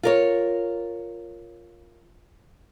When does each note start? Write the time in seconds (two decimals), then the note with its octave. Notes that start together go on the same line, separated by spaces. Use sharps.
0.03 F4 A#4 C#5